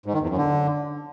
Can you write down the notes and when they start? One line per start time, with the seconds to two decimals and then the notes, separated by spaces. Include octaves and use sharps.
0.06 G#2
0.14 D#3
0.22 E2
0.30 F#2
0.38 D3